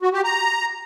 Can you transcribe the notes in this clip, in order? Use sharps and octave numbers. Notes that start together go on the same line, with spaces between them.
F#4
G4
A#5